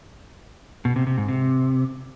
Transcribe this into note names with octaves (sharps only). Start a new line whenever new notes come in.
B2
C3
C3
G#2
C3